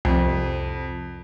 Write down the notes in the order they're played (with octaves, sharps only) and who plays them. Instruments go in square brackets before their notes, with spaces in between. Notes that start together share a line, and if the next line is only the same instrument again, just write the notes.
[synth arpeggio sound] C2 [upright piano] F2